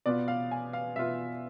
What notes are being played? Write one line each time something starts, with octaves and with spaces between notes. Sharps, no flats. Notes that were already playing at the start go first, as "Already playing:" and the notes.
B2 B3 F4 D5
F5
G#5
F5
B2 B3 F4 E5